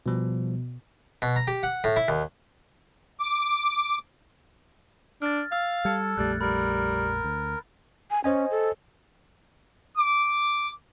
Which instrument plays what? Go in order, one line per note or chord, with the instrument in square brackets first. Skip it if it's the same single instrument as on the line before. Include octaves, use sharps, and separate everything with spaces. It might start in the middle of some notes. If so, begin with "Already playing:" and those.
[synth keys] B2 [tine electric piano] F3 G3
[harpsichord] B2
A#5
G4
F#5
A2
E4
D#2
[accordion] D6
[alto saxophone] D4 [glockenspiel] F6 A6
[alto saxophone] F5 [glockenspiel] E6 A6
[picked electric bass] G3 [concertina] A4 [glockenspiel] F6 G#6 C#7
[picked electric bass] A#1 F2 A3 [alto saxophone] G3 [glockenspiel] F#6 A6
[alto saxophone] G3 [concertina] A#4 [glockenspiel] B5
[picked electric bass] D2
[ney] G#5
[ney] C#4 [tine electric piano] C5 D#5 G#5
[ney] A4
[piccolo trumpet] D6